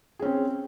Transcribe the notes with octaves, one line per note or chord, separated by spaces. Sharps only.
C4 C#4 G#4